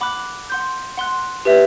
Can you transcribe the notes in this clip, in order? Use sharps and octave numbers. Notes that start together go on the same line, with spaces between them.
F#5 B5 D6 F#6
F#5 C6 G6
F#5 C6 F#6
G4 B4 E5